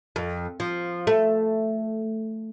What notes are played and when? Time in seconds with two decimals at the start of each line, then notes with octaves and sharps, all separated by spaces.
0.16 F2
0.60 F3
1.07 A3